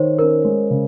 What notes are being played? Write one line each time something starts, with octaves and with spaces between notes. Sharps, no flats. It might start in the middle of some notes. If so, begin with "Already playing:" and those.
Already playing: D#3 C5 C#5
C#4 A#4
G#3
C#3